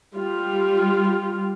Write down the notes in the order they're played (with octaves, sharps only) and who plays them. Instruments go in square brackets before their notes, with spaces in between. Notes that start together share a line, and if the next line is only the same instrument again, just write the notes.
[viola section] G3 F4